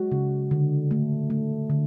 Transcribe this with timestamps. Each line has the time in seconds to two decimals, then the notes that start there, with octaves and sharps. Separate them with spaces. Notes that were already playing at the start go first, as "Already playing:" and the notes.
Already playing: G#3 F#4
0.12 C#3
0.51 D3
0.91 A3
1.30 A3
1.70 D3